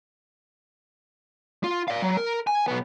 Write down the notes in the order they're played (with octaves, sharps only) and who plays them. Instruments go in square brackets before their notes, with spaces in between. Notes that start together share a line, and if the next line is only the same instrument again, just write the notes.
[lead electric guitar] F4
D5 F5
F#3
A#4
G#5
B1 B3